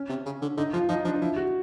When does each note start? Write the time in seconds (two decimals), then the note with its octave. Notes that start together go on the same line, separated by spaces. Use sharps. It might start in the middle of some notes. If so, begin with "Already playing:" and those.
Already playing: C#4
0.09 C3
0.26 C#3
0.42 D3
0.57 D3 D#4
0.73 F3 F4
0.89 F3 D#4
1.05 F3 D4
1.21 F3 E4
1.36 F#4